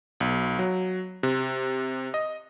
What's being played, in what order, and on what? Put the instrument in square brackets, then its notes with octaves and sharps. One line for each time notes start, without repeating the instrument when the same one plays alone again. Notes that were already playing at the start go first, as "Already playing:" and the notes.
[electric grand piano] B1
F#3
C3
D#5